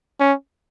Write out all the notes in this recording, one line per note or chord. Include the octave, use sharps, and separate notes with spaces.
C#4